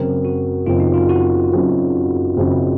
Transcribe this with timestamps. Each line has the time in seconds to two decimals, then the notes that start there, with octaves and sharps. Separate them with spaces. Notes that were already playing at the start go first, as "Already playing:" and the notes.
Already playing: F#1 F#2 C#3 F#3 C4 A#4
0.25 F#4
0.66 F#1 F#2 C#3 F#3 C4 F4
0.80 D#4
0.94 F4
1.09 F#4
1.52 F#1 F#2 C#3 F#3 C4
2.37 F#1 F#2 C#3 F#3 C4